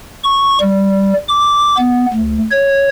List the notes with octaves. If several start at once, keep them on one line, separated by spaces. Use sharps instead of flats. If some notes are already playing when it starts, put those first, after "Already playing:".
C#6
G3
D6
B3
D2
C#5